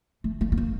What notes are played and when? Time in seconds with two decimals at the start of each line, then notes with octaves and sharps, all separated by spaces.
0.24 A3
0.41 A#3
0.52 B3
0.58 A#3